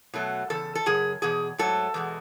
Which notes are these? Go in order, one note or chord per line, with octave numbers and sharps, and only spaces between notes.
B2 F#3 A3
E2 C#3 A4
A4
F#2 C#3 G#4
E2 B2 G#4
G#2 F#3 A3 A4
E2 B2 G#3